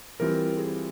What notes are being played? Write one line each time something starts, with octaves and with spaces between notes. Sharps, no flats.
E3 G3 C4 F4 A#4
G#4